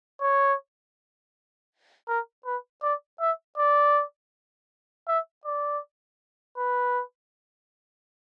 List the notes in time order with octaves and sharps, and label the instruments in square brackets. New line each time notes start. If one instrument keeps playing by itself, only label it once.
[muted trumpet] C#5
A#4
B4
D5
E5
D5
E5
D5
B4